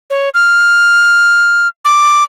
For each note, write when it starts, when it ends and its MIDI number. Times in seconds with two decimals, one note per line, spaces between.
0.10 0.29 73
0.34 1.68 89
1.85 2.24 86